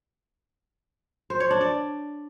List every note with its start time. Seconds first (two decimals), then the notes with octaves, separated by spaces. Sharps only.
1.30 C5
1.40 C#5
1.51 D4
1.61 D5